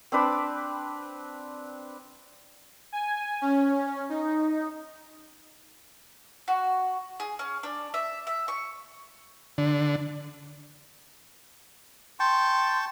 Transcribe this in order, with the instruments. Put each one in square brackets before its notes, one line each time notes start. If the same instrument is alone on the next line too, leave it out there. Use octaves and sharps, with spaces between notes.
[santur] C4 D4 B4 D6
[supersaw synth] G#5
C#4
D#4
[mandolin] F#4
G#4
C#4
D4
E5
E5
C#6
[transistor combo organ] D3
[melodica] G5 A5 C#6 [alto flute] C6